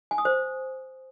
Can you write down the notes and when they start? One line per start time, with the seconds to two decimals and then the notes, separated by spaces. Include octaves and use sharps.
0.11 G#5
0.18 D#6
0.25 C5